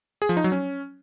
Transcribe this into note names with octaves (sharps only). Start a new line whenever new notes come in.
G#4
F3
D#4
F#3
C#4